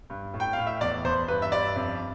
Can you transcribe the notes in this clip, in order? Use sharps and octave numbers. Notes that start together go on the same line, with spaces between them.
G2
A2
G5
A2 F5
E5
E2 D5
E2 C5
G2 B4
E5
G2 D5
F2